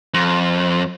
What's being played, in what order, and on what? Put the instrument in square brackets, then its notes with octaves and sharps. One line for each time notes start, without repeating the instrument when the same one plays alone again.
[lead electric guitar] F2